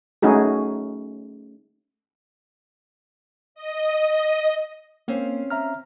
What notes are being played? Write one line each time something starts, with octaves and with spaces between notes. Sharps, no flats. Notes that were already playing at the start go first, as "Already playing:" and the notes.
A3 C#4 D#4 F#4 G#4
D#5
A#3 C4 C#4 F5
E5 A#5 F6